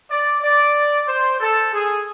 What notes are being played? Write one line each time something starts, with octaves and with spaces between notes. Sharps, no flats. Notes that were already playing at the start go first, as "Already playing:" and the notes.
D5
D5
C5
A4
G#4